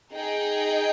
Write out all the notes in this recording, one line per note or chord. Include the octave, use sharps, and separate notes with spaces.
D#4 G#4 D#5 G5